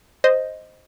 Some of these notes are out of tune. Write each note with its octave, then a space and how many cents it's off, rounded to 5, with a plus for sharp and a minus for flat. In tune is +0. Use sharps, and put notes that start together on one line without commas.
C5 +0 D#5 +0